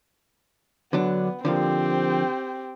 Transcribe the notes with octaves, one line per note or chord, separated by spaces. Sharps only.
D3 F#3 B3 D4
D3 F3 A#3 C4 G4